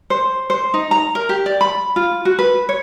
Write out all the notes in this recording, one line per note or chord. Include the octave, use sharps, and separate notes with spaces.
C5
C5
D#4
A#5
A#4
G4
D5
B5
F4
F#4
B4
C#5